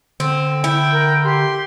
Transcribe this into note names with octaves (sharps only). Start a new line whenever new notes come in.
D3 C4
E4 G5
A#4
G4 C6